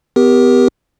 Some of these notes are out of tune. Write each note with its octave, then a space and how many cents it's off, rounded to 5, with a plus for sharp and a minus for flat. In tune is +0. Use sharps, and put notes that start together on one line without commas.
B3 +25 G4 +5 A#4 +30